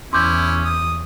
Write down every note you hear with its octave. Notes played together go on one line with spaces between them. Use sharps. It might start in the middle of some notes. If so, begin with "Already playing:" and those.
E2 C#4 E4 C6 D6 G6
D#6